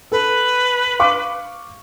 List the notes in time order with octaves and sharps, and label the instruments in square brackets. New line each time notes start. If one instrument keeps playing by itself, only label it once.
[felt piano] A4 [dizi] B4
[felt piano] F5 C#6 D6